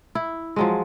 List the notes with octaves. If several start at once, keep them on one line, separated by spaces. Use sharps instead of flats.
E4
F3 F#3 G#3